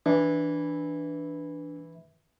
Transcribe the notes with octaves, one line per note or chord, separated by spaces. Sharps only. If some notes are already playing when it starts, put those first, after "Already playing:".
E3 D4